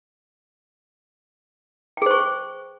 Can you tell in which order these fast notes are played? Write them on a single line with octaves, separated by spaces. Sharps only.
G5 G#4 C5 C#6